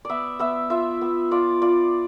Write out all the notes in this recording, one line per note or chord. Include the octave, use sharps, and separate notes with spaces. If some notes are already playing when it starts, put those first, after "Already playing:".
B3 D5 E5
B3 E5
F4 E5
B3
F4 D5
F4 D5